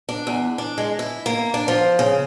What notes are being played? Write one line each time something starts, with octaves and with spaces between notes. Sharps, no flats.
D4
E2
D4
G#3
E4
A#3
D4
F3
C#3